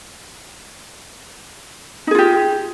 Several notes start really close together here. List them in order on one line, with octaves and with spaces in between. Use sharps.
D#4 G#4 F4 G4